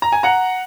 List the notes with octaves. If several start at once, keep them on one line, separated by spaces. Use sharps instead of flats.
A#5
G#5
F#5 A#5